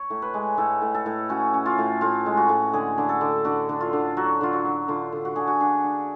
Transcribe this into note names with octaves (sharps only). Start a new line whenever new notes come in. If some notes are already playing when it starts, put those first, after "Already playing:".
Already playing: C#5
A2
B4
G#3
A2 A4
A2
A4
A2
C#4 F#4
C#4
F4
A2
A2 F4
G#3
F#4
A2
D3 G#4
D3
A4
D3
D3 F#4
D3
F4
D3
F#3 F#4
D3 F4
F#4
D3
D3 F4
D3
F#4
D3 G#4
F#4
D4 G#4
D4